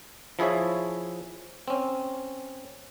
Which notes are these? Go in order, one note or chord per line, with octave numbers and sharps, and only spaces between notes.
F3 E4 G#4 C#5 E5
C4 C#4